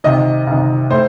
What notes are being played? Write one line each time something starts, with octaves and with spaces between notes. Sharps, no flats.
C2 C3 D#3 D#5
C2 C3 D#3
A2 C5